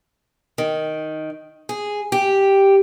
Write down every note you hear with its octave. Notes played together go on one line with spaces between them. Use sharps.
D#3
G#4
G4